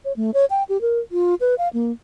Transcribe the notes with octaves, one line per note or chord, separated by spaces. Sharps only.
C#5
A3
C#5
G5
G4
A#4
F4
B4
F5
A#3